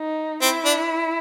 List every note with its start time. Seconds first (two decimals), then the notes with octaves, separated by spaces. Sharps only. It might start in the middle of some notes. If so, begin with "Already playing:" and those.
Already playing: D#4
0.41 C4 E4
0.65 D4